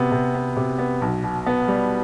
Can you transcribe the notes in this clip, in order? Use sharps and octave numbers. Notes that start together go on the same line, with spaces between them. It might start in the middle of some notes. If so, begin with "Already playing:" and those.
Already playing: C3 B3
C3
B3
C3
B3
B1
B2
B3
G3